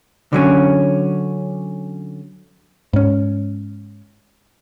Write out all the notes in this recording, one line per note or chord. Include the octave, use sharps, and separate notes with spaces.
D3 F#3 C#4
G#2 C#4